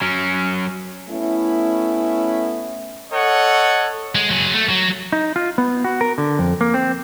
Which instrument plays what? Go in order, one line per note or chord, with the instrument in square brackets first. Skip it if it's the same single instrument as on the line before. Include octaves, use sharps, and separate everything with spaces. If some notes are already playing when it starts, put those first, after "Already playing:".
[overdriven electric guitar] F#3 C#4
[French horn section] A3 B3 C#4 E4
[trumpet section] A4 C#5 D#5 F#5
[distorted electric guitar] G#3
F#3 G#4
A3
F#3
[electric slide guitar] D#4
F4
B3
F#4
A#4
D3
F2
A#3
C4